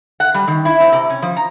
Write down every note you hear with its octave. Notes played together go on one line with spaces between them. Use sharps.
F#5
G3
D#3
E4
C4
C3
C#4
F3
A#5